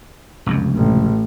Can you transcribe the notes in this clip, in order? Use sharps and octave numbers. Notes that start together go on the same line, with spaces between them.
F1 C#2 F#2
A1